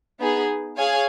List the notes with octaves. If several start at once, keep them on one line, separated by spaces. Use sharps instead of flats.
B3 D#4 G#4
G#4 C#5 F5 G#5